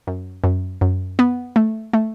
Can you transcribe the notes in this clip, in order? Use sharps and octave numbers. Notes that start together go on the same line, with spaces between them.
F#2
F#2
F#2
B3
A3
A3